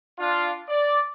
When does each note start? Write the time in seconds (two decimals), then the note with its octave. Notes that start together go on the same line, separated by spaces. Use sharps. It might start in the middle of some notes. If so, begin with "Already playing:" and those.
0.19 D4 F4
0.68 D5